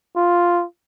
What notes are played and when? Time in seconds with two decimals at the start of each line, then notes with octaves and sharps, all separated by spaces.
0.16 F4